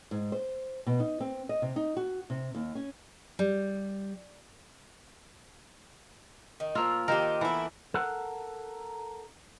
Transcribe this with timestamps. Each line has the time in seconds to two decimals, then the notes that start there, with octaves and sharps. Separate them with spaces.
0.11 G#2
0.32 C5
0.87 B2
1.00 D#4
1.21 C4
1.49 D#5
1.62 C3
1.76 D#4
1.97 F#4
2.30 C3
2.55 D#2
2.75 C#4
3.39 G3
6.60 D#3
6.75 A#2 F3 A#3 F4 E6
7.08 D#3 G4 A#4 C5
7.41 E3 A3 B3 E4 E5 D6
7.94 A4 A#4 F#5